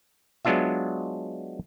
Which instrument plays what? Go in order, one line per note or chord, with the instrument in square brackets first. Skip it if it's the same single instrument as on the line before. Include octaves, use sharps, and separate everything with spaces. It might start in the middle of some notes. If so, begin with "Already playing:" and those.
[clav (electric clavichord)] F#3 G#3 B3 D4 F4 E5